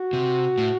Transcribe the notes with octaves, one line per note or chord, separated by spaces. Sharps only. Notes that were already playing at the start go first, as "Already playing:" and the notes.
Already playing: F#4
C3
A2